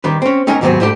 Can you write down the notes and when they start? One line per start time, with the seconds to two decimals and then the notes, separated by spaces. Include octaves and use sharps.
0.04 D#3 G3 B4
0.22 C4 C#4
0.47 C4 C#4 D#4 A#4 G#5 A#5
0.61 D#2 G#2 C3 F#3 B3 C4
0.80 G#2 G3 A3 D4 F4 G4